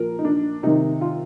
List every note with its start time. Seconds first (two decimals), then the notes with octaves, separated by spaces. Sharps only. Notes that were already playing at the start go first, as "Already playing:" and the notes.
Already playing: A#2 F3 A#4
0.19 D#4
0.25 D4
0.63 C3 D#3 D#4
1.01 F4